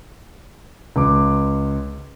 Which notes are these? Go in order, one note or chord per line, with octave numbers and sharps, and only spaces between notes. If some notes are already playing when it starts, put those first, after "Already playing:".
C#2 D6